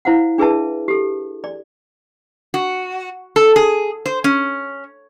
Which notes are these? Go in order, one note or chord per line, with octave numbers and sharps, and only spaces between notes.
E4 C5 F5 F#5
D4 G#4 B4 E5 A5
G4 A4
D5
F#4
A4
G#4
C5
C#4